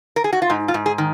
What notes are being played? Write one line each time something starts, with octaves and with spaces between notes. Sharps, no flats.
A#4
G#4
F#4
F4
G#2 D#4
F4
G#2
G#4
D#3